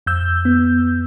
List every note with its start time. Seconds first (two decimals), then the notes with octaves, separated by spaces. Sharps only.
0.06 F2 E6 G6
0.45 B3